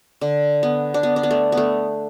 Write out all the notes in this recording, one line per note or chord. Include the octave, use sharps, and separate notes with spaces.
D3
B3
D4
B3
D4
B3
A3
B3
A3